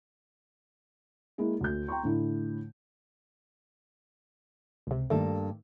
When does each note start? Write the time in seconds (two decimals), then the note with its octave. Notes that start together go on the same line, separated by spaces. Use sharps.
1.38 G#3 A#3 E4
1.61 D2 G6
1.88 G5 A#5 C6 C#6
2.03 A2 D3 E4
4.87 C#2 C3
5.10 G2 D#3 A3 A#3 A4